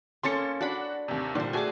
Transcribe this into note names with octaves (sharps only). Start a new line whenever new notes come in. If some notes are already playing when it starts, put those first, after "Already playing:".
A#3 C#4 A4 C6 A6 C#7
D4 F#4 F#5 B5
D#2 C3
A#2 D3 G3 C5
A3 F#4 G#4 G#5 D6